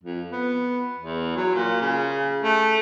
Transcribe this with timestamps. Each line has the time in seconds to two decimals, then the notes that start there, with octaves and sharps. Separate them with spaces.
0.04 F2
0.32 B3
0.98 E2
1.36 F#3
1.55 A#2
1.81 C#3
2.43 A3